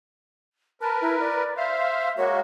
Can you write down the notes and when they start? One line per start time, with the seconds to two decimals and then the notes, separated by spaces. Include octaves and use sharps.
0.81 A#4 B4 A5
1.02 E4
1.20 D5
1.57 C5 E5 F5
2.17 G#3 A#3 F#4 C#5